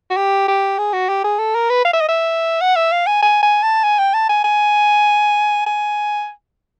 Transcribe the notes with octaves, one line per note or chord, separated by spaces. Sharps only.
F#4
G4
G4
G#4
F#4
G4
G#4
A4
A#4
B4
F5
E5
D#5
E5
F#5
E5
F5
G#5
G#5
G#5
A5
G#5
G5
A5
G#5
G#5
G#5